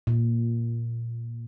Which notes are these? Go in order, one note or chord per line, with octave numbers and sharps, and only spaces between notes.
A#2